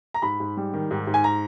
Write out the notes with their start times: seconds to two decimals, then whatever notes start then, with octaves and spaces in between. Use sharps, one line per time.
0.14 A#5
0.22 G#2 B5
0.40 G#2
0.57 G3
0.73 D#3
0.91 G#2
1.07 G#2
1.14 G#5
1.24 A#5